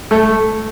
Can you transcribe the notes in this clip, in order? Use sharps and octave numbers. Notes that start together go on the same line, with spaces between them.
A3 A4